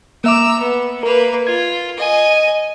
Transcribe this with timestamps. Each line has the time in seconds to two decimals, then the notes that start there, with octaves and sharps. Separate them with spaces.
0.24 A#3 E5 A#5 D6 E6
0.59 B3
1.03 A#3 A#4 B4
1.47 F4 G#6
1.98 D#5 G#5